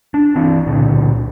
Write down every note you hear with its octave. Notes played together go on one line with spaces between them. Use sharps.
D4
E3 C4
C#2 A#2 D3